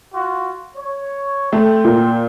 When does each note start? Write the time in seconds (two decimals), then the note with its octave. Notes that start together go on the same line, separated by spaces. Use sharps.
0.13 F4 F#4
0.76 C#5
1.53 A3 C4 G5
1.85 A#2